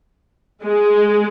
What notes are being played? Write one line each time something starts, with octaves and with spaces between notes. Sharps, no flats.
G#3